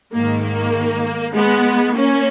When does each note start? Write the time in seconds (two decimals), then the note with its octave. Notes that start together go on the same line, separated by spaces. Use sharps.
0.13 G#2 D#3 A#3
0.43 A#3
1.34 G#3 B3
1.96 A#3 C#4